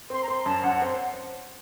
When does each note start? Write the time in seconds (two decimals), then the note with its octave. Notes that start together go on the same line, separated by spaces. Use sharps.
0.10 C4 C6
0.23 A#5
0.28 C4 C6
0.40 A#5
0.45 F#2 A5
0.63 F#2 F#5
0.81 C4 C6